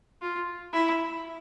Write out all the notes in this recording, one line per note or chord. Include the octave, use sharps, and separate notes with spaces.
F4
E4